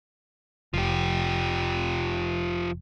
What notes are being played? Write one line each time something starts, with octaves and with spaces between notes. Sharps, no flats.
F1 F3 G4